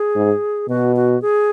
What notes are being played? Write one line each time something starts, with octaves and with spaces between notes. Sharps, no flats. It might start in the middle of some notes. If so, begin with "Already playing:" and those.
Already playing: G#4
G#2
B2 F#4
F#4
G#4